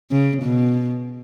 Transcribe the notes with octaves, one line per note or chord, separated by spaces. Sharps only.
C#3
B2